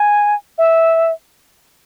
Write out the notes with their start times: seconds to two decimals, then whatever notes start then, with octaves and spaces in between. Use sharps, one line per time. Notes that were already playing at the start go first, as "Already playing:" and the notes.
Already playing: G#5
0.58 E5